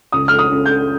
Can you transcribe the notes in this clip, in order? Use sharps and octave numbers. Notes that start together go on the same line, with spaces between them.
C#2 D#6
F6
D#6
C#3
G6